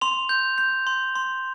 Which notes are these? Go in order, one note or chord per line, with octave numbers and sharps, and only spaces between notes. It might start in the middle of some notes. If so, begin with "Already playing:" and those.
C6 F7
G6
G6
C6
C6